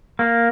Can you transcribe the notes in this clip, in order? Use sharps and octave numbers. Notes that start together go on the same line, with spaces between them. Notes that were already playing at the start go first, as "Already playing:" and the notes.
A#3